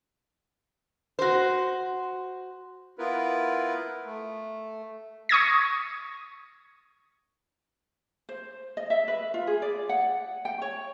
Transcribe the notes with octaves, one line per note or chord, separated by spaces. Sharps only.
F#4 C5
B3 E4 F4 A#4 B4
A3
C#6 D#6 G#6 A#6
C5
D#5
E5
B4
F4
G#4
D5
F#5
G5
C#5